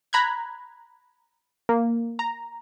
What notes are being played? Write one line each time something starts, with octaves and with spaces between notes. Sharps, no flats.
A#5 B5 F#6 G#6
A#3
A#5